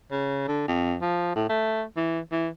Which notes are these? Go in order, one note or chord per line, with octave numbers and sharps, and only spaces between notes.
C#3
D3
F2
F3
A2
A3
E3
E3